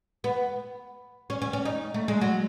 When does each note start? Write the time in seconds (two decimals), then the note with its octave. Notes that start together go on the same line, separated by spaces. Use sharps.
0.24 B3
1.30 C#4
1.42 C#4
1.53 C#4
1.65 D#4
1.94 A3
2.08 G#3
2.21 F#3